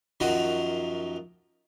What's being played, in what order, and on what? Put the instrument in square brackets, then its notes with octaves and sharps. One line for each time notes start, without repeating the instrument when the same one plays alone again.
[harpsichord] F#2 D#3 F3 F#4 D#6